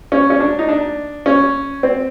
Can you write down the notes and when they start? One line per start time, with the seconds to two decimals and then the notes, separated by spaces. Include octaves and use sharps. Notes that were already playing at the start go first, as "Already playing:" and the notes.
0.12 C#4
0.30 C#4
0.40 D4
0.59 D#4
0.69 D4
1.26 C#4
1.83 C4